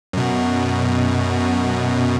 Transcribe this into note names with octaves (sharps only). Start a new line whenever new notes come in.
F#2 B2